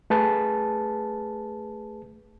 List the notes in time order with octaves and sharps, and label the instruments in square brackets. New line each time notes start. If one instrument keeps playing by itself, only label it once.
[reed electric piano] A3 G#4 B4 A5